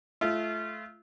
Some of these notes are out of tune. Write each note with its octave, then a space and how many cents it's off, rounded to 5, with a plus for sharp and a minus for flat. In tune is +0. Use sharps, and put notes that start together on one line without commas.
A3 -25 F4 -25